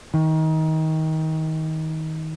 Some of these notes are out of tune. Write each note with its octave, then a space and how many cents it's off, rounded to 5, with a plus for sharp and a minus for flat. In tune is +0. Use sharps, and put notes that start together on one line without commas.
D#3 +25